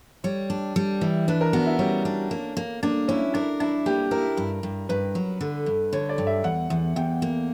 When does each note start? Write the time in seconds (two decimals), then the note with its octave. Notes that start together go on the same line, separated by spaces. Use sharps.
0.24 G3 C#5
0.50 D4
0.76 G3
1.01 E3
1.28 D4 B4
1.41 A#4
1.53 B3 F#4
1.66 E4
1.79 G3 C#4
2.05 D4
2.31 A#3
2.57 A#3
2.83 A#3 D4
3.08 C#4 E4
3.34 D4 A#4
3.60 D4 E4
3.86 A#3 G4
4.11 E4 A#4
4.37 G2
4.63 G2
4.89 G2 B4
5.15 F#3
5.41 D3
5.66 G2
5.93 D3 C#5
6.09 D5
6.18 G2
6.27 E5
6.44 E2 F#5
6.70 E2
6.96 E2 G5
7.22 A#3